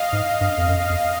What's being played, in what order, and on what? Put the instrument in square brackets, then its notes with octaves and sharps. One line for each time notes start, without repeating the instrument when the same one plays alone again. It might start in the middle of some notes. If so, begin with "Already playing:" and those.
Already playing: [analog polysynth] D#5 F5
[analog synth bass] G#2
G2
F2
F#2
F2